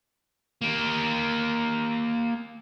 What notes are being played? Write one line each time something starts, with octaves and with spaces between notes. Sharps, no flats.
A#3 G4